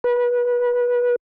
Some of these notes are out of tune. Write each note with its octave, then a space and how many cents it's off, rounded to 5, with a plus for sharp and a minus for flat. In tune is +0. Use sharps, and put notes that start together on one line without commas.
B4 -25